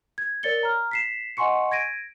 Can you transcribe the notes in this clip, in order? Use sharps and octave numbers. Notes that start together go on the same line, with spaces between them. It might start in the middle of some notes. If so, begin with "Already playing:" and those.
G#6
A#4 C#5 D5 A6 C#7 G7
A#5 F6
B6 C7 E7
D#5 F#5 G#5 C6 C#6 C#7
G#6 A#6 D7 D#7